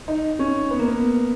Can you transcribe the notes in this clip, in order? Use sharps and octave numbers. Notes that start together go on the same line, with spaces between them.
D#4
C#4
B3
A#3
B3